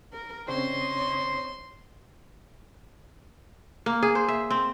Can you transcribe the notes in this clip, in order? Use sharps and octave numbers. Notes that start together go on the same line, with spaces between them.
A#4
C#3 C4 D4 C5 C#5 D#5 C6
A#3
G#4
C5
E5
C4